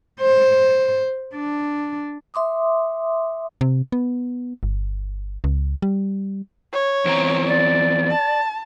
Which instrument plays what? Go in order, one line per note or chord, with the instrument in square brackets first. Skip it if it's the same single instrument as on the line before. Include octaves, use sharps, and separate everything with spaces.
[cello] C5
D4
[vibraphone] E5 C6 D6 D#6
[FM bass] C3
B3
G1
C#2
G3
[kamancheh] C#5
[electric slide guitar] E2 C4 A#5
[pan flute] D5
[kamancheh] A5